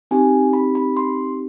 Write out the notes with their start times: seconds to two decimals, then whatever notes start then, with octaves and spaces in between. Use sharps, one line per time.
0.11 C4 D#4 G4 G#5
0.53 B5
0.75 B5
0.97 C6